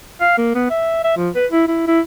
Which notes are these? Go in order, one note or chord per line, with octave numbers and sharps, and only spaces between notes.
F5
A#3
B3
E5
E5
F3
B4
E4
E4
E4